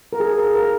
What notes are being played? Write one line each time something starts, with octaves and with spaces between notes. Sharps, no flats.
A#4
G#4
A#4
A#4